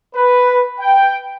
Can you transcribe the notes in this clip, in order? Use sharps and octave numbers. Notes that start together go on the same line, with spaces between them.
B4
G5